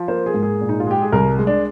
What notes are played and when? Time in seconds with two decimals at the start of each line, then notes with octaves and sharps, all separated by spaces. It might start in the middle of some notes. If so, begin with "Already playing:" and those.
Already playing: F3
0.08 A#3 C5
0.26 G#4
0.34 G#2
0.43 G#4
0.61 A#2
0.69 D#4
0.80 F4
0.87 G#3 G4
1.02 G#4
1.12 C2 A#4
1.39 G#3
1.47 D4